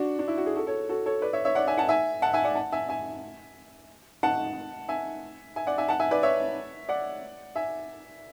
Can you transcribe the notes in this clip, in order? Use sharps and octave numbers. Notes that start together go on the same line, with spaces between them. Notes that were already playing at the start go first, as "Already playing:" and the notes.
Already playing: D4 F#4
D4
E4
F#4
G#4
F#4 A4
A4 C#5
F#4 A4
A4 C#5
B4 D5
C#5 E5
C#5 E5
D5 F#5
E5 G#5
F#5 A5
E5 G#5
F#5 A5
E5 G#5
D5 F#5
F#5 A5
E5 G#5
E5 G#5
F#5 A5
E5 G#5
E5 G#5
D5 F#5
E5 G#5
F#5 A5
E5 G#5
B4 D5
C#5 E5
D5 F#5
E5 G#5